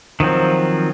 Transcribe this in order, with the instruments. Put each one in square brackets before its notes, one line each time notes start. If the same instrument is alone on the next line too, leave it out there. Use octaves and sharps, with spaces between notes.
[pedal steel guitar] D#3 F3 F#3 C4